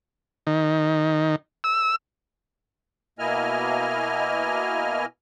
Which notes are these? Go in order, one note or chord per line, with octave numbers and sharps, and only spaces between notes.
D#3
E6
B2 A#3 E4 D#5 G#5 F6